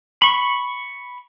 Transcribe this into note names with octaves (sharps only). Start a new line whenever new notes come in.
B5 C#6